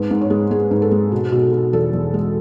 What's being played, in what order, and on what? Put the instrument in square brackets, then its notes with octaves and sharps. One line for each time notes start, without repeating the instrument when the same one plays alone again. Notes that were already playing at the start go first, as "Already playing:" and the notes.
Already playing: [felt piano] G#2 B4
G#2
C#5
G#3
G#3 G#4
G#2
A4
G#3
B2
B2
B2
E2 A4
E2
G#3